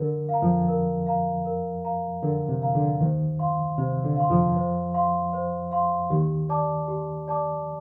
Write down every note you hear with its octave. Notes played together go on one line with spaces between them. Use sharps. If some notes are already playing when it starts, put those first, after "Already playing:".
Already playing: D3 A#4
F5 A#5
F2 F3
A#4
F5 A#5
A#4
F5 A#5
D3 A#4
C3
F5 A#5
D3
D#2 D#3 C5
F5 C6
C3 C5
D3
F5 C6
F2 F3
C5
F5 C6
C5
F5 C6
D#2 D#3 G4
D5 A5 D6
G4
D5 A5 D6